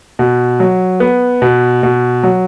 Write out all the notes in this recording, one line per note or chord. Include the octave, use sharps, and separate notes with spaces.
B2
F#3
B3
B2
B2
F#3